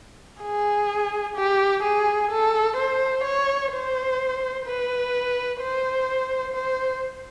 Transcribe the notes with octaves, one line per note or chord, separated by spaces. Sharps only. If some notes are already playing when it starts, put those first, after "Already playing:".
G#4
G4
G#4
A4
C5
C#5
C5
B4
C5
C5